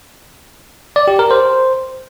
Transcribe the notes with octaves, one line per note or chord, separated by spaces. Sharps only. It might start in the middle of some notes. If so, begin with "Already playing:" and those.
D5
G4
A#4
C5